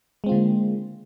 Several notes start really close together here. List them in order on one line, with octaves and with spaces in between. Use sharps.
G#3 C4 F4 D3 A#3